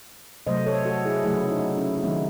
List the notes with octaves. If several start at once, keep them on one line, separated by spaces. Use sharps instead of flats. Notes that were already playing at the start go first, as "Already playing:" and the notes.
C3 F#3 A3 C5 D#5
A4 C#5
F#4 A4
E4 G#4
C#3 F#3 A3 E4 G#4
E4
D#4 F#4
C#4 E4
E4
D#3 F#3 A3 C4 D#4